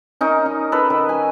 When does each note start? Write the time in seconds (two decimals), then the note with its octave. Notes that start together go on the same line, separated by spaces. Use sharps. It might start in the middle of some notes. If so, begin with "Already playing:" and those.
0.21 C#4 D#4 A#4
0.46 D#5
0.72 A4 B4 C#5
0.90 D#3
1.09 G#5